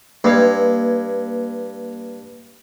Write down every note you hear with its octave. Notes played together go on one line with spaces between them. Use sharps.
G2 A#3 B4 G#6